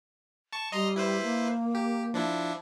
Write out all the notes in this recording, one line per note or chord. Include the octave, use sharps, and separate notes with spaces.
A5 C#6
G3 D#5 A#5 C6
E4 B4 C5
A#3
G4
F3 D4 E4